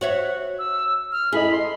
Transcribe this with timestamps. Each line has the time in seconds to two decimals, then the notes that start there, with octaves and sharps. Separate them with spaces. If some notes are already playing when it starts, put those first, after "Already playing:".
0.01 F#4 C#5 E5
0.59 E6
1.12 F6
1.32 E4 G#4 A4 D#5 B5
1.52 C6